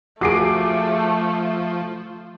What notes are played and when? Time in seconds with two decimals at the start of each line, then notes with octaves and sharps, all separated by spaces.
0.21 F3 A3 F#4 G#4 D6 C7 D7